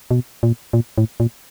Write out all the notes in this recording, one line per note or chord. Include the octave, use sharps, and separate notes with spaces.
B2
A#2
A#2
A2
A#2